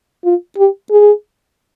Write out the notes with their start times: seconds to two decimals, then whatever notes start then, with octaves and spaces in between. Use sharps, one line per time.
0.24 F4
0.58 G4
0.91 G#4